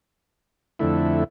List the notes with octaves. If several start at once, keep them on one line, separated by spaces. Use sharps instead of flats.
F2 D3 A3 E4